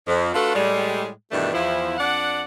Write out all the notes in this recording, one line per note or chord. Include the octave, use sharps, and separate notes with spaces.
F2
A3 D4 F4 F#4 A4 B4
A2 G3 G#3
G2 B2 D#3 E3 A3 D4
E2 F3 E4
F2 D4 D5 F#5